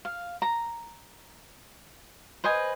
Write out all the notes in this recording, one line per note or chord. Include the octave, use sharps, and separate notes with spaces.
F5
A#5
B4 C5 D#5 G#5